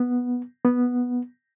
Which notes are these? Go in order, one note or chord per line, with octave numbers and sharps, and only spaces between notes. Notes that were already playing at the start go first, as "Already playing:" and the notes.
Already playing: B3
B3